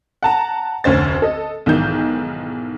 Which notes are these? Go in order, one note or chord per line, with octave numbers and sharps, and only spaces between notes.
F#5 A5 A#5
F1 D2 C#4 C5 A6
A4 D#5
B1 G#2 D#3 E3 G6